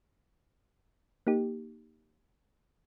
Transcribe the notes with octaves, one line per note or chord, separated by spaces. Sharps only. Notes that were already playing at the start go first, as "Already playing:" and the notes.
A#3 D#4 G4